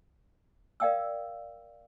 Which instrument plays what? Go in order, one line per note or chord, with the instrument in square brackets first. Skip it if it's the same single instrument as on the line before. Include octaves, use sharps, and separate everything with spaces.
[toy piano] A#4 D5 F5 G5 D#6 E6